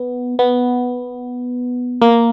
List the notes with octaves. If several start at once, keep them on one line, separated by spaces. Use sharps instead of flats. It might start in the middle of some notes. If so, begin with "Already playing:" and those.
Already playing: B3
B3
A#3